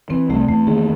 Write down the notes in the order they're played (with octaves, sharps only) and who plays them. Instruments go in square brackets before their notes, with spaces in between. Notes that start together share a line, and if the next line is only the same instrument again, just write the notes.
[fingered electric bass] E3 [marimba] C4
[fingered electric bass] C2 [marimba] A3
[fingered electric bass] E2 [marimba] A3
[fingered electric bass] D#3 [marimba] G#4